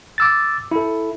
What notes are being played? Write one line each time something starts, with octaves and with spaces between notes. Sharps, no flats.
D6 E6 A6
E4 A4